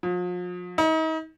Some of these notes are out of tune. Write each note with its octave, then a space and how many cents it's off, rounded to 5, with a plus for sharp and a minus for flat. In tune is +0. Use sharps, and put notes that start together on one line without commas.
F3 +40
D#4 +40